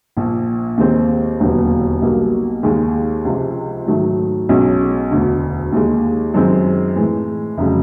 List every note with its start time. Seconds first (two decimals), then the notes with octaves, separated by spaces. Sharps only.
0.17 A#1 A#2 F3
0.78 D#2 D#3 G#3 C4
1.40 E1 D#2 D3 F#3 B3
2.02 B1 B2 G3 A#3
2.63 D#2 D#3 G#3
3.25 C#2 C3 F3 G#3
3.86 G#2 D#3 F#3 A3
4.49 B1 B2 G#3 C#4
5.11 E1 D2 D3
5.72 D#2 D#3 G#3
6.34 F#2 D#3 G#3 C4
6.96 A2 E3 G#3
7.57 F1 C#3 F#3